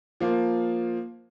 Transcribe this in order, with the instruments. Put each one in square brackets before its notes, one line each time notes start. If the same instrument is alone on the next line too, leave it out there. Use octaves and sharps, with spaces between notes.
[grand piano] F3 A#3 F4